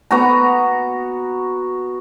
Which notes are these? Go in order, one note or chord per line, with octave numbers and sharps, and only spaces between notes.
B3 F#4 A#5